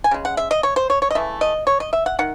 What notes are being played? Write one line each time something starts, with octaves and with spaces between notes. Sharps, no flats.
G#5
C#3 G#3
F#5
E5
D#5
C#5
C5
C#5
C#5
D#5
C#3 E3 A3 E5
D#5
C#5
D#5
E5
F#5
D#3 F#5